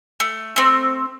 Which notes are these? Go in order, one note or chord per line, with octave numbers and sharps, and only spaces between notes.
A3
A3 C4